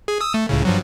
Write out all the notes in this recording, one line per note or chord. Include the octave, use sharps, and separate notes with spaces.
G#4
D#6 E6
A3
C#2 A2 C#3
G2 F3 F#3